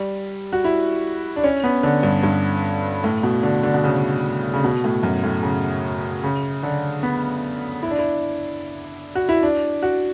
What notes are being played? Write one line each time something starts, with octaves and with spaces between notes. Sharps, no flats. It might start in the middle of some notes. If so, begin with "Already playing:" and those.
Already playing: G3
F#4
E4
D4
C#4
B3
D3
G2
G2
A2
B2
D3
D3
B2
C#3
C#3
B2
A2
F#2
A2
C#3
C#3
D3
B3
E4
D4
E4
F#4
E4
D4
F#4